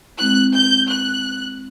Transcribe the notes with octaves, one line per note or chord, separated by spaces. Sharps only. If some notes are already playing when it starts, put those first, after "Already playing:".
G#3 C4 E4 F#6
G6
F#6